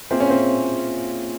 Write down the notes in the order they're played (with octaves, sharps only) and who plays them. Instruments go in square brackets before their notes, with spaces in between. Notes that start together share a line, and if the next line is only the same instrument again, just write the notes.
[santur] A#3 F4 G#4 E5 [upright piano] C4
[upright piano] C#4
C4